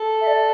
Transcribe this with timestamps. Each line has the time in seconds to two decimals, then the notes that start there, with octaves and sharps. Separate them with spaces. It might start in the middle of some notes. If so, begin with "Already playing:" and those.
Already playing: A4
0.21 E5
0.27 D5